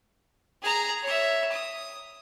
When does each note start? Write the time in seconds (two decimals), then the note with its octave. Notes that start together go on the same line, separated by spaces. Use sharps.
0.62 G#4 A#5
1.03 C#5 E5
1.52 D#6